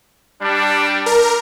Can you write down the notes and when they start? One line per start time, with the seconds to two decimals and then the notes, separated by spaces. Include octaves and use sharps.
0.42 G3 D4
1.06 A#4